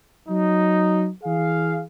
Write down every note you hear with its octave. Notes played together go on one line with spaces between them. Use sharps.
F#3 D#4
E3 G#4 F5